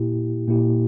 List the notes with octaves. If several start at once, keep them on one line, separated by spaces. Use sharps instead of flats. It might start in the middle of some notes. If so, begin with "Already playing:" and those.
Already playing: A#2 A#3 E4 G4
A#2 A#3 E4 G4